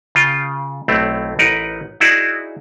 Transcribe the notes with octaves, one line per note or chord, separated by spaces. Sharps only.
C#3 F4 G5
B1 A2 A3 C4
A1 D#4 A#4 B4 F#5
D#4 E4 F#4 G#4 D5